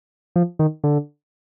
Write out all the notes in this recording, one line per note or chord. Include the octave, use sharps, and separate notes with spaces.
F3
D#3
D3